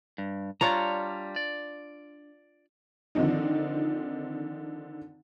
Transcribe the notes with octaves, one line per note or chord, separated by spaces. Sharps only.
G2
G3 D4 F4 C#5 A#5
D5
D3 D#3 F3 C4 D#4